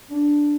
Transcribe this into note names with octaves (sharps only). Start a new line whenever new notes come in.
D4